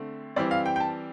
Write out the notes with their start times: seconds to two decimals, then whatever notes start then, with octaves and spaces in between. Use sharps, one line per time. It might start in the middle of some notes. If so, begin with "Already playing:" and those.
Already playing: D3 A3 C4
0.36 E3 G3 C4 D5
0.51 F5
0.66 G5
0.76 G5
0.80 A5